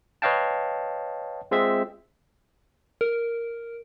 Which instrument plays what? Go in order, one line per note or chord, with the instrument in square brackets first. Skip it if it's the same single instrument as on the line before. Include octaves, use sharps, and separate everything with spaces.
[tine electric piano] B4 C#5 D#5 F5 G5 A5
G#3 C4 F4 G#4 E5
[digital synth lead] A#4